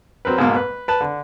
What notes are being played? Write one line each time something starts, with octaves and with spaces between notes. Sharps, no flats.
F#3 C4 A#4 B4
G#2 B2 A#3
B4
B4 A5
D3